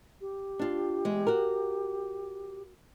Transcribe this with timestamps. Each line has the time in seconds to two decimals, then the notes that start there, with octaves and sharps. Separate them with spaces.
0.21 G4
0.59 D4 F4
1.05 E2 G#3
1.27 F#4 A#4